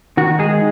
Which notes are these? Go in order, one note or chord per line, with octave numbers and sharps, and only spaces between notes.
D#3 F#4
G#3 G#4